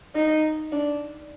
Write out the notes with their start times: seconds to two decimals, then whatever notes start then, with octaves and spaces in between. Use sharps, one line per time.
0.15 D#4
0.72 D4